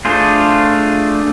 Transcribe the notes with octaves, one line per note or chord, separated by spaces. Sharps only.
A3 D4 F4 G#4 C5